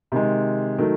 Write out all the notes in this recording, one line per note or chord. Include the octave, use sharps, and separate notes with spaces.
C3 D#3 G#3
D#3 F#3 A3